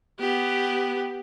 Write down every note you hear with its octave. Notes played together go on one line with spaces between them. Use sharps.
B3 G4